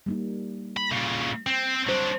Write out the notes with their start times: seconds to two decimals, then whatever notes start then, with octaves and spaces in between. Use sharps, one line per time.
0.06 G3 A#3 D#4
0.77 B5
0.92 A#2 C#3
1.47 C4
1.89 F#3 G3 D4 C5